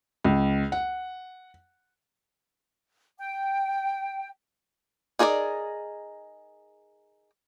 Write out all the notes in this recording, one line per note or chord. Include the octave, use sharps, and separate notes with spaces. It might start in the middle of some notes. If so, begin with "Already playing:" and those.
C#2
F#5
G5
D#4 G#4 A#4 C#5 D5